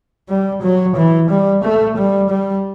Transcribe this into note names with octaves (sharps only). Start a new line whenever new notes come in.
G3
F#3
E3
G3
A3
G3
G3